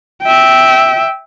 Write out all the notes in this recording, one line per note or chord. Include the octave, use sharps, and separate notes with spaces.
E5 G5